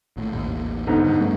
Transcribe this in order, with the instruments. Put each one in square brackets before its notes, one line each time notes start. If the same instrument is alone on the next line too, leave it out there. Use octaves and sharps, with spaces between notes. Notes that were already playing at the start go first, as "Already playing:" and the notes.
[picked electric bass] G#1 A2
A1 D#2
[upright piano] G1 G#2 B3
[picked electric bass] G2
G3 A3 C#4